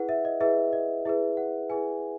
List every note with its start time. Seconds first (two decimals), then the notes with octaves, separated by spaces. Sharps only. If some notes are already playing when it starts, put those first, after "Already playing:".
Already playing: E4 G#4 B4 F#5
0.09 E5
0.25 D#5
0.41 E4 G#4 B4 E5
0.73 D#5
1.05 E4 G#4 B4 E5
1.37 F#5
1.70 E4 G#4 B4 G#5